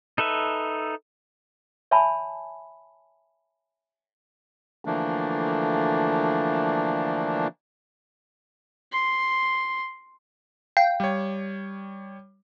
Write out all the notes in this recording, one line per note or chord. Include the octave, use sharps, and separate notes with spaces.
D#4 A4 B4 E5
C#5 E5 G#5 A5 B5
D3 E3 F3 A3 A#3 D4
C6
F5 G5
G3 C#5